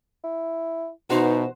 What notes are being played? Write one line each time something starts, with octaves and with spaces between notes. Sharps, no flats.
E4
B2 E3 D#4 F#4 C5